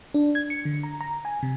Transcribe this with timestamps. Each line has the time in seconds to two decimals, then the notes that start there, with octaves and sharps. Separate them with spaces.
0.14 D4
0.35 G#6
0.50 C#7
0.65 D3
0.83 A#5
1.01 A#5
1.25 G#5
1.43 C3